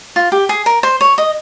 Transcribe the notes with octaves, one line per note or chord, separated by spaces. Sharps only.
F4
G4
G#4
A#4
C5
C#5
D#5